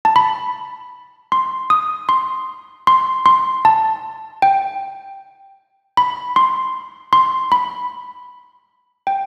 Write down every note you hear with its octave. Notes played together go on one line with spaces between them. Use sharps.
A5
B5
C6
D#6
C6
C6
C6
A5
G5
B5
C6
C6
B5
G5